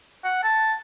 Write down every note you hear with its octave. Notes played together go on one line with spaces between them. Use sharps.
F#5
A5